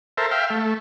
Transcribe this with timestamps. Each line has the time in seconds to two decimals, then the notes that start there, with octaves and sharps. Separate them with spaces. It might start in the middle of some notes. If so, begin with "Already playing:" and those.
0.17 A4 A#4 C5 E5
0.31 E5 F5 G5
0.50 A3